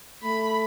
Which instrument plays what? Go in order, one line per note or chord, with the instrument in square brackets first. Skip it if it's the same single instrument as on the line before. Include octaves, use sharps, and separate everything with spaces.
[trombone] A3 [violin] B5